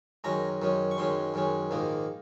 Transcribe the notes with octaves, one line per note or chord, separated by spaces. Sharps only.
F#2 D#3 G#3 C#4 A#5
F#2 D#3 G#3 C#4
C#6
F#2 D#3 G#3 C#4 C6
F#2 D#3 G#3 C#4
A#1 G#2 D#3 A#3 D#4